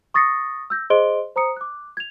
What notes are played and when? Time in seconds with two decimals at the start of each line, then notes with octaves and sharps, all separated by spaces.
0.14 C#6 D#6 A6 A#6 C7 C#7
0.70 E6 G6 A#6
0.90 G#4 C5 D#5 C6 D7 G7
1.36 C5 A#5 D#6 C#7
1.56 D6 F#6
1.97 G#6 F7